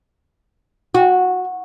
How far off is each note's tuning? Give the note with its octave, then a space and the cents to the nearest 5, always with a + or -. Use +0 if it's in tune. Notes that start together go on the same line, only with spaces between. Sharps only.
F#4 -15